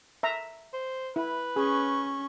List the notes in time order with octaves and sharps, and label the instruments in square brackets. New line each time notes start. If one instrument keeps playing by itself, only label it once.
[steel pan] E5 A#5
[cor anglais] C5
[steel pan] E4 [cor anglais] B4
[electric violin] C#4 C#6 [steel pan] G#4